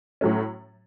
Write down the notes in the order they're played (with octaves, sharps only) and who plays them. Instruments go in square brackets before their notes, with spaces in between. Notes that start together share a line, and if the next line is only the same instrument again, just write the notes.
[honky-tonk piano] A2 F#3 A3 C#4